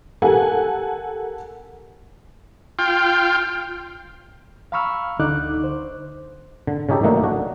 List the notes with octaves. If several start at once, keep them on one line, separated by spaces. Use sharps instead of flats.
G4 A4 A#4 F#5 G#5 A5
F4 G5
F5 A#5 B5 C#6 E6 F6
D2 D3 D#4 D6 F#6
C5
D3
C#3 C#4 D#4 G4 A4
D#3 F#3 A3 A#3 D4 D#4
D4 F#4